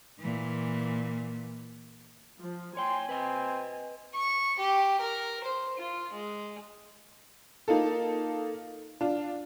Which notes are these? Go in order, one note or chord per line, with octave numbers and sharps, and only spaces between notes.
A#2 E3
F3
C#5 G5 G#5 C6
C4 B4 D#5
C#6
G4
A#4
C5
F4
G#3
A#3 D#4 F4 A4
D4 F4